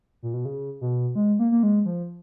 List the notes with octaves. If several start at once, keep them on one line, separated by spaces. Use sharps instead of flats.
A#2
B2
C#3
B2
G#3
A#3
A#3
G#3
F3